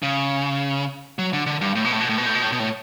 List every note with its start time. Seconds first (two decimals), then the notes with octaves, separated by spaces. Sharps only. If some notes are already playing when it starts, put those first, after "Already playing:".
0.03 C#3
1.19 F#3
1.33 D3
1.46 D3
1.61 G2
1.75 A2
1.85 B2
1.92 A2
2.00 B2
2.09 A2
2.18 B2
2.26 A2
2.35 B2
2.43 A2
2.52 B2
2.60 A2